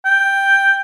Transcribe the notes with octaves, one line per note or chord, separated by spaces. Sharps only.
G5